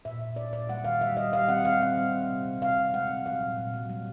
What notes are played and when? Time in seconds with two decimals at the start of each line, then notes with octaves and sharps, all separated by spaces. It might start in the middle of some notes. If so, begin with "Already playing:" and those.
0.05 A#2 E5
0.20 A#2
0.36 A#2 D5
0.53 A#2 D5
0.69 G3 F#5
0.84 D#3 F5
1.01 G3 E5
1.17 G3 D#5
1.33 G3 F5
1.49 C4 F#5
1.65 G3 F5
1.81 C4 F#5
1.98 G3
2.14 G3
2.29 C3
2.45 C3
2.62 C3 F5
2.77 C3
2.94 G#3 F#5
3.09 C3
3.26 F#3 F5
3.41 A#2
3.58 A#2
3.73 F#3
3.89 G3